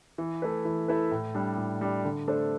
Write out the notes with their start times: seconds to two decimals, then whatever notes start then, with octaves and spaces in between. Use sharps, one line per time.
0.18 E3
0.42 A3 E4 B4
0.65 E3
0.88 A3 E4 B4
1.12 A2
1.35 G3 D4
1.58 A2
1.81 G3 D4
2.05 D3
2.28 A3 D4 A4 C5